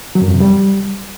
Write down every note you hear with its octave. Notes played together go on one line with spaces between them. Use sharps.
F#3
F#2
F2
C3
G3